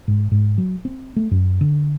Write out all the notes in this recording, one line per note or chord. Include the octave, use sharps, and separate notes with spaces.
G#2
G#2
F#3
C4
A3
F#2
D3